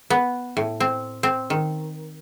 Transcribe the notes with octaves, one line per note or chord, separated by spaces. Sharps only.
B3
A2
C4
C4
D#3